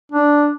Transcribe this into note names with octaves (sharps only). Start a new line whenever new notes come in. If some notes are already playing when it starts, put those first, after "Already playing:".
D4